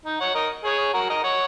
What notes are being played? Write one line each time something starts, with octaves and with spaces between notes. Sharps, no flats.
D#4
C#5 F#5
A#4 D#5
G#4 C#5
F#4 A#4
A#4 D#5
C#5 F#5